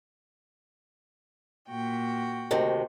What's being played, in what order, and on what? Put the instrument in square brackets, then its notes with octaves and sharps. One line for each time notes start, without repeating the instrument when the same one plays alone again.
[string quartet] A#2 F#4 G5
[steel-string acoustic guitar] D2 C3 D#3